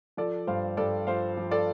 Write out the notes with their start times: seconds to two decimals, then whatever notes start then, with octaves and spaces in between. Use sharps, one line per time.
0.17 F3 A4 D5
0.47 G2 C5 F5
0.77 G2 A4 D5
1.07 F3 C5 F5
1.37 F3
1.51 A4 D5